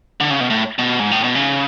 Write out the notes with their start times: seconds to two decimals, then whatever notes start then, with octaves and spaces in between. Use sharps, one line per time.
0.20 D3
0.30 C#3
0.40 B2
0.50 A2
0.79 B2
1.00 G#2
1.11 A2
1.24 B2
1.35 C#3